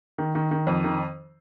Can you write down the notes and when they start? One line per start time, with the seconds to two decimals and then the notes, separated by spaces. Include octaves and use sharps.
0.18 D#3
0.35 D#3
0.51 D#3
0.67 F2
0.84 D#3